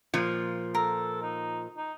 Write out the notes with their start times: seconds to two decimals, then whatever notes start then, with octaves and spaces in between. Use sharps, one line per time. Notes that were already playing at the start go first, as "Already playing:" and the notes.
0.14 A#2 F3
0.75 A4 A#4
1.22 D#4
1.77 D#4